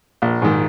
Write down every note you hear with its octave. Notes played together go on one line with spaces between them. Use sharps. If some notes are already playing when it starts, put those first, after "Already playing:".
A#1
G#2 D#3